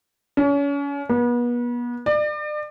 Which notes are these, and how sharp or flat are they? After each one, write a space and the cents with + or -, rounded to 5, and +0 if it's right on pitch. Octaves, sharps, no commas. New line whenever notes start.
C#4 +35
B3 -35
D5 +35